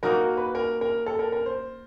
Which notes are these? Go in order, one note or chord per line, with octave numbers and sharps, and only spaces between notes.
A#3 D#4 F#4 A#4
A#4
B4
A#4
A#4
A4
A#4
A#4
C5